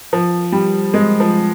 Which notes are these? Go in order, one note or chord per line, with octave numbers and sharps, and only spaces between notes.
F3
G3
G#3
F3